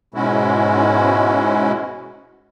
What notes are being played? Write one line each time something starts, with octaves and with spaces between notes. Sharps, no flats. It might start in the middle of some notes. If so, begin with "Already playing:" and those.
G#2 B2 G#3 C#4 E4 F#4